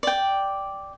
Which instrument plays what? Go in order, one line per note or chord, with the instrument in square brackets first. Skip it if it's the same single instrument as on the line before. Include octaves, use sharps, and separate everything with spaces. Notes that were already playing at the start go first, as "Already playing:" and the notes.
[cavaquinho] D5 G5